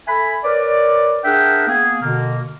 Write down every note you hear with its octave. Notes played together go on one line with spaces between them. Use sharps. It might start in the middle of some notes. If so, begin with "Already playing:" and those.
A4 E5 G#5 B5
A#4 B4 C#5 D5
D4 G#4 A#4 E5 F#5 G5
A#3 B3 G#4
B2 D3 A#3